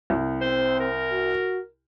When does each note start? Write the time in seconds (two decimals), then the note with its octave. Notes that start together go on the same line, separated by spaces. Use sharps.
0.10 C2
0.41 C4 C5
0.80 A#4
1.11 F#4